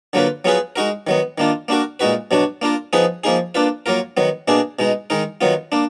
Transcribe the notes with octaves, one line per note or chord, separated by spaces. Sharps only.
D3 F#3 A#3 F4 B4
F#3 B3 F4 G#4 B4
G#3 D#4 F#4 A#4
D#3 F#3 B3
D#3 A#3 D4 F4
A#3 D4 F#4 A#4
A#2 G#3 D#4 F#4 B4
B2 F#3 D4 F#4
A#3 D4 F4 A#4
F3 B3 D#4 G#4 B4
F3 A#3 D#4 G#4
A#3 D4 F4 B4
F#3 A#3 F4 A#4
D#3 F#3 B3
B2 A#3 D4 G#4
B2 G#3 D#4
D#3 G#3 D#4 A#4
D#3 F#3 B3 F4
A#3 D4